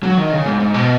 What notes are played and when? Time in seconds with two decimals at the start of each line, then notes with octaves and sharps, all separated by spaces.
0.03 F#3
0.17 D#3
0.32 C#3
0.46 G#2
0.60 G#2
0.74 B2